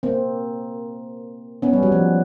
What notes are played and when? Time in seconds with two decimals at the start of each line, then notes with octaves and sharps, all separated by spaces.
0.03 A#3 C4
1.62 B3 C#4
1.73 G3
1.83 F#3
1.92 F3